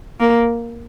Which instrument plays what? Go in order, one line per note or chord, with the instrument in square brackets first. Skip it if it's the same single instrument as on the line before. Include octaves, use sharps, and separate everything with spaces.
[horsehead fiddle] A#3